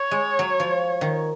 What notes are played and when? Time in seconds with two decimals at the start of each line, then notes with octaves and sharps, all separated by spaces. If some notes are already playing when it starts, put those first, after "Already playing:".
Already playing: C#5
0.11 G#3
0.39 F#3
0.60 F3
1.01 D#3